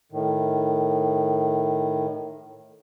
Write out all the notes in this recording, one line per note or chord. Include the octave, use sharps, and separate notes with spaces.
A2 D#3